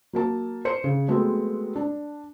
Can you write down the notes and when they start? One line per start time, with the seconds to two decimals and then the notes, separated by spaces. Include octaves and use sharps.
0.13 F#3 A#3 A5
0.65 C5 C#7
0.84 C#3
1.08 F#3 G#3 A3 B3 C4 B4
1.75 D4